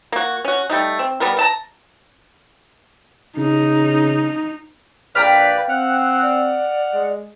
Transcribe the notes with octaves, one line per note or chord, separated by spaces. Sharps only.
A#3 F#4
C#4 F#4
G3 A3 D#4
C4
G3 B3 A#4
A3 A5 A#5
C#3 D#4
A#1 B4 D5 F5 G5 A#5 B6
C4 F#5 F6 F#6
D5
G#3